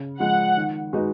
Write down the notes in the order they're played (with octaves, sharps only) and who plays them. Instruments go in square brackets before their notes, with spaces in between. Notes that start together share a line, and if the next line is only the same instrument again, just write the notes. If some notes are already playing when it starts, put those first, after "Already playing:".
Already playing: [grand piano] C#3
[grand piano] F3 G#3 [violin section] F#5
[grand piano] D#3
G#3 D#4 F#4 B4